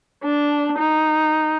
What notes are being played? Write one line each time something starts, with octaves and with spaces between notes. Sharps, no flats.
D4
D#4